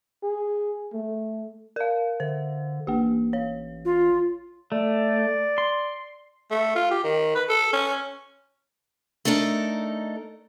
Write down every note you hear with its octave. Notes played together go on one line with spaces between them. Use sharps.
G#4
A3
A#4 F5
D3 C5
A1 A#3 G4
C#5
F4
A3 D5
C6
A3
F4
G4
D#3
B4
A4
C#4
A3 D4 D#4 A4 A#4